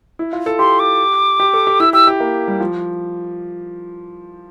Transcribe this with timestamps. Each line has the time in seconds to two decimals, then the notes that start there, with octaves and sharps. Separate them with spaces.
0.19 E4
0.33 F4
0.46 A4
0.59 G4 C6
0.79 D6
1.40 G4
1.54 A4
1.67 G4
1.80 E4 E6
1.93 G4 E6
2.07 G4
2.20 A#3
2.48 G3
2.61 F3